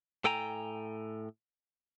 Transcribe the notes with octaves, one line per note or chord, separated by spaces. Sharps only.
A2 A4 G5 G#5 A#5